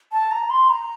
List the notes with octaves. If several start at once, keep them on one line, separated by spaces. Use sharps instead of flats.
A5
A#5
C6
A#5